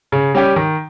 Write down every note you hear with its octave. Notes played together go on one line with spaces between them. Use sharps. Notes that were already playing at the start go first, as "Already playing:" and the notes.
C#3
G3 C#4 G4
D#3